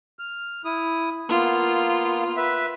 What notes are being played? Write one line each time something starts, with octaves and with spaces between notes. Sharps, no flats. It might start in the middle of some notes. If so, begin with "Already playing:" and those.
F6
E4 D#6
A#3 B3 F4
B4 E5